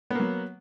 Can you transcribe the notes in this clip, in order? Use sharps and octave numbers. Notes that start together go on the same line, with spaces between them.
F#3 A#3 B3